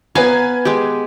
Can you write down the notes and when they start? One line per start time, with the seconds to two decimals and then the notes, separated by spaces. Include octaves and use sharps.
0.15 B3 B4 F5 G#5 A#5 G#6
0.65 G#3 G4